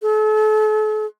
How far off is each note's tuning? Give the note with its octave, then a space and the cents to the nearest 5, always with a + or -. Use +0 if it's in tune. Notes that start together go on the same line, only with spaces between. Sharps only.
A4 -40